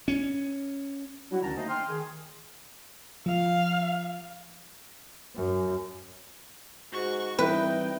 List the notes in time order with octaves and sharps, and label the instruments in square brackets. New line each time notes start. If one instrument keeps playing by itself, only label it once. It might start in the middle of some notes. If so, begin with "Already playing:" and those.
[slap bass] C#4
[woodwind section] F#3 G3 D4 E4 F#4
D2 D3 D#3 C#4 A5 A#5
A3 A#3 D4 D#4 C5 D#5
G5 C6 D#6 F6
D#3 G#4
[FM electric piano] F3 [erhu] F5
[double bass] F#2
[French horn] G#2 [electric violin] F#4 C#6
[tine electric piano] E3 G3 C4 [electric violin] D#4 G5 [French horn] E4 [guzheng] B4